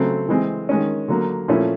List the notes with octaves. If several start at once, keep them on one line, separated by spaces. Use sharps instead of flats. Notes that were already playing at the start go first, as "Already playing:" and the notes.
Already playing: C#3 F#3 A3 C4
E3 G#3 C4
D#3 G#3 C#4
D3 F#3 A#3
A#2 F3 A3 C#4 E4